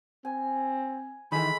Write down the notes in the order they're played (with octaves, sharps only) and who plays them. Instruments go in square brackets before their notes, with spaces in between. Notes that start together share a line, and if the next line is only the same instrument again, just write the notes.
[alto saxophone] C4 [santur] G#5
[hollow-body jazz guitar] D#3 E3 [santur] G#3 A3 [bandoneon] B5